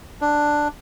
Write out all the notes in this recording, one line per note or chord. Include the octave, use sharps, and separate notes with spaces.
D4